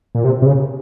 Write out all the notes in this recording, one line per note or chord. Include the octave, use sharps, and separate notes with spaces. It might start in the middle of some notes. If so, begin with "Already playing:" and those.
A#2
C3
C3
C#3